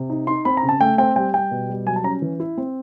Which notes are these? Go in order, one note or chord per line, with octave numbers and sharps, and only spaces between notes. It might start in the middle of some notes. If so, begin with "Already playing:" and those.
Already playing: C3
D#4
D#4 C6
C4 B5
A#5
C#3
A5
A3 G5
C4 G5
G3 G5
G3 G5
B2
G3
F#3 G#5
A5
C#4 A#5
E3
E4
C4